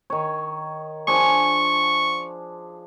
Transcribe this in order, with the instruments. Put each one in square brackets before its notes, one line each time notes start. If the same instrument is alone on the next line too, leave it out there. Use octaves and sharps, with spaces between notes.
[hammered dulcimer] D#3 C#5
[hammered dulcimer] F3 D4 G#4 [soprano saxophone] C#6